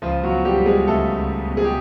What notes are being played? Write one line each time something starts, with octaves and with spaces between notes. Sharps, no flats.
C#2 F3 F4
F#3 F#4
B2
G3 G4
G3
G#3 G#4
C#2 A3 A4
C#2
B2
G#4
G4